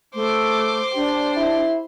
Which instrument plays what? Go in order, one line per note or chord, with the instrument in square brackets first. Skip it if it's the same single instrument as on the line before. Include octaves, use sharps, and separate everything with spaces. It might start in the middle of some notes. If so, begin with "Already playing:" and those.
[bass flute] A3 [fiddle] C5 [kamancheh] D6
[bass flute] D4 [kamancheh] G4 D5
[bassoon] E4